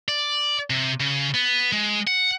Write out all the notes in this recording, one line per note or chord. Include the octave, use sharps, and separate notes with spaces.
D5
C3
C#3
B3
G#3
F#5